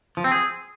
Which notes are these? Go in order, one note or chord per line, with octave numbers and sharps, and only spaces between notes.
F3
C4
G#4